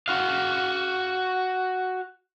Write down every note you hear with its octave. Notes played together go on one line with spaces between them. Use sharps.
F#4 F5